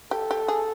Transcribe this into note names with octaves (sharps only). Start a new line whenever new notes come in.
G4 A4
G4
G#4